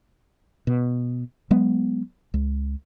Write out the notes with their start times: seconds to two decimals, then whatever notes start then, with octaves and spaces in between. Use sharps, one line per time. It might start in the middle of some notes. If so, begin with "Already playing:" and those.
0.67 B2
1.51 F#3 G#3 B3
2.34 C#2